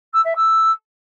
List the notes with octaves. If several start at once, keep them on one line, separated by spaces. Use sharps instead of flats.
E6
E5
E6